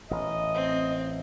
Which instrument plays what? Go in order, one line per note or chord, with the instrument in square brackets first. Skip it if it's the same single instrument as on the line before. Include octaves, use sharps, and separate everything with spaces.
[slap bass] A1 [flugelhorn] D#5
[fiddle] C4